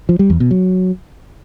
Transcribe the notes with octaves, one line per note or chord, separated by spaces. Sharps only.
F3
G3
E2
B2
F#3